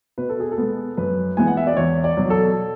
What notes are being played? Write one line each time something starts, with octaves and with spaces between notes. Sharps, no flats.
B2 B4
A4
G#4
A4
G#3 B3
F#2 B4
E3 G#3 B3 G#5
F#5
E5
D5
E2 C#5
D5
B2 F#3
A4